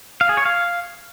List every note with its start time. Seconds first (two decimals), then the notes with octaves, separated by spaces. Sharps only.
0.21 F5
0.29 G#4
0.37 C#5
0.46 F5